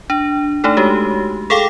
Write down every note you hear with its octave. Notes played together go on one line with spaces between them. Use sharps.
D4
A3 D4 D#4 A4
G#3 F#4 G4
G#4 A4 F5 G5 D6